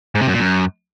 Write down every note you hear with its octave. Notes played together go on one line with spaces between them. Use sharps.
G#2
C3
F#2
A#2
F#2